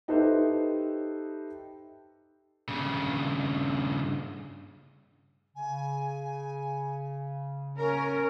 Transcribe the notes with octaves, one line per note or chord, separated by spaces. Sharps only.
D#4 G4 A4 B4 C5 E5
G2 C#3
C#3 G#5
C#4 A#4 A#5